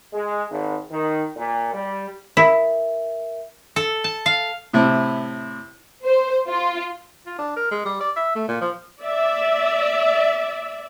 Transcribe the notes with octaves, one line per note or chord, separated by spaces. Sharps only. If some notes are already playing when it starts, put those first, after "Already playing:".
G#3
G#1
D#3
A#2
G3
E4 A#4 E5
A4
A5
F5
A2 C3 E4
C5
F4
F4
D4
A#4
G#3
G3
D5
E5
A3
A#2
F3
D5 E5